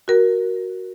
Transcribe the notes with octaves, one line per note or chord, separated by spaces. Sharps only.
F#4 A#4